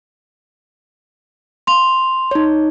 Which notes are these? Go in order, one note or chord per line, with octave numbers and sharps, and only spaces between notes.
C6 F7
D#4 C#5